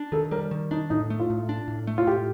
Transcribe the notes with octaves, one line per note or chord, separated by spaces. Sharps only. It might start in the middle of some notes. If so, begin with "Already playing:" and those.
Already playing: D4
D#3 A4
G3 A#4
D#3
D4 D#4
A2 D#4
A3
F4
A2
D4
A2
A3
F4
A2 G4